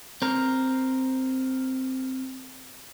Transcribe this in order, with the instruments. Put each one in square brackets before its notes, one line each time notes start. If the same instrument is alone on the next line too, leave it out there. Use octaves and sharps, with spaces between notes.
[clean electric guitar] C4 A#4